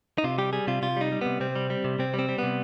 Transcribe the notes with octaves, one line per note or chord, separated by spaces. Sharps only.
D#4
C3 F4
G3 G4
G3 G#4
C3 F4
C3 F4
G3 D#4
G3
C3 B3
C3 C4
G3
G3
C3
C3 C4
G3
C4
G3
C3 B3